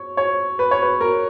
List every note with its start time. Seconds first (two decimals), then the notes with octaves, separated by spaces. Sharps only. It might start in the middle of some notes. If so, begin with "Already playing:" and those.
Already playing: C#5
0.17 C#5
0.59 B4
0.71 C#5
0.83 B4
1.01 A#4